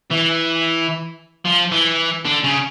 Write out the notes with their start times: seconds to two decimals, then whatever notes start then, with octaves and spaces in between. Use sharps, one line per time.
0.11 E3
1.45 F3
1.72 E3
2.25 D3
2.44 C#3